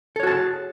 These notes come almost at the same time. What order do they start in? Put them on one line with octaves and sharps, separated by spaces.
A4 C#5 F#4 A5 G#4